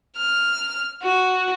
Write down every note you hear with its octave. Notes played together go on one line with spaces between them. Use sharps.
F6
F#4